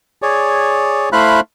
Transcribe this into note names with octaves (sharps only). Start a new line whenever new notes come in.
G#4 C#5 D5
A3 E4 C5 F5 B5 F#6